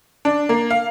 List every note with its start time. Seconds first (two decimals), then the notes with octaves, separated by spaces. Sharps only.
0.25 D4
0.49 A#3
0.70 F5